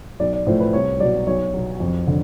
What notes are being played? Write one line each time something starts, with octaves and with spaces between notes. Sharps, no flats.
B1 D5
D5
A2 F3 A3 C5
B4
C2 C#5
B2 F#3 D5
B1 C#5
B2 F#3
F2
D3